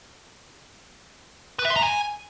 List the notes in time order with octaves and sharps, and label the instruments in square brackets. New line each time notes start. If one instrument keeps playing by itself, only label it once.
[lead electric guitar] B4
E5
C6
A#5
G#5